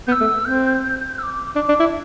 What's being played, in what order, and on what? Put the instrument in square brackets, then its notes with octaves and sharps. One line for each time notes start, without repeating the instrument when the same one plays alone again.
[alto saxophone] B3 [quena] G6
[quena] E6
[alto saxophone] A3
[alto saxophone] C4 [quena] G6
[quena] E6
D6
[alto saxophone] D4 [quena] D6
[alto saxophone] D4
E4